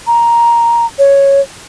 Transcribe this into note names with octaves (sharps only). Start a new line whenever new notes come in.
A#5
C#5